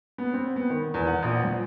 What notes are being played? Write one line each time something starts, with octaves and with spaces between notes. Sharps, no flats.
B3
C4
B3
D#3
E2
F#5
A#1
F3